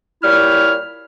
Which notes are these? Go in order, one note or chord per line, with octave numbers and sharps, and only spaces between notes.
A#2 G3 E4 C#5 F6